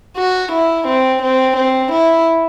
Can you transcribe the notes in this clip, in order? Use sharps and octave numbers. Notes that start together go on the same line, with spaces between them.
F#4
E4
C4
C4
C4
E4